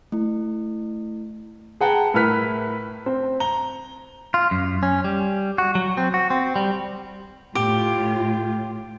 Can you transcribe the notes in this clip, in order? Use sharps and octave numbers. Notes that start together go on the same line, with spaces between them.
A3 E4
G#4 B4 F#5 G5 A5 A#5
A2 E4 A#4 B4 F6 B6
C4 C5
A#5 G7
F4
F#2
C#4
G3
F#4
F#3
C4
F#4
C4
G3
A2 F4 G4